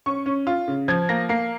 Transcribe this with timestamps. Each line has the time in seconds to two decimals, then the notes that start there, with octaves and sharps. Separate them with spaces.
0.06 C#4 C#6
0.26 C#4
0.47 F4
0.68 C#3
0.88 F3 G#6
1.09 A#3 A#6
1.29 A#3 C7